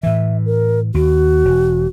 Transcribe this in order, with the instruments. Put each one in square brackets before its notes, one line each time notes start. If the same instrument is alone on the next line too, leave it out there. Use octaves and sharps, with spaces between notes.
[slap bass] A2 E3 [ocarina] E5
[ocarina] A#4
[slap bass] D#2 [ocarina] F#4
[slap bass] E1